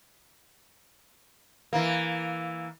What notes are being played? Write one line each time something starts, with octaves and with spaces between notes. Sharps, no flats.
E3 A#3